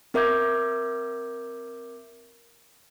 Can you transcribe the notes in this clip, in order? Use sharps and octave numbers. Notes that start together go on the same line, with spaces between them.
C4 A#4 E5 D6 G6 G#6